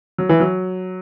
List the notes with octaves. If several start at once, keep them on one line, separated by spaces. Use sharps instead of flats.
F#3
E3
F#3